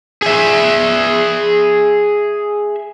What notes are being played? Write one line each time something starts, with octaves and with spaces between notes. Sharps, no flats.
G#4 E5